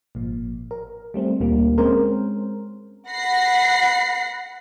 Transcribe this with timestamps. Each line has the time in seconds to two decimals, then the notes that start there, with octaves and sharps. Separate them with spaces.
0.15 G#1 A#2 F3
0.71 A#4
1.14 G3 A3 C4
1.40 D2 A#2 D3 G3 A#3
1.78 G#3 C4 C#4 A#4 C5
3.09 F#5 B5 A#6 C7